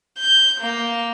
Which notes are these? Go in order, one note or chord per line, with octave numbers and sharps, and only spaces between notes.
G6
A#3